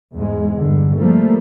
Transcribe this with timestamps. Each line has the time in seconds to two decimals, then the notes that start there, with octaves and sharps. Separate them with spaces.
0.13 E2 G#2 G#3
0.55 G2 D3
0.96 F3 G3 A3 A#3